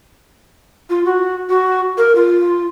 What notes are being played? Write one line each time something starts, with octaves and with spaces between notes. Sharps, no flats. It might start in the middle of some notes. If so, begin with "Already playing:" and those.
F4
F#4
F#4
A#4
F4